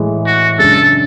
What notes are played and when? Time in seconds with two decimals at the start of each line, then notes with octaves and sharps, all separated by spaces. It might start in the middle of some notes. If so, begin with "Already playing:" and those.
Already playing: A2 E3 G#3
0.27 F#4
0.59 F#2 C#3 G#3 D4 A4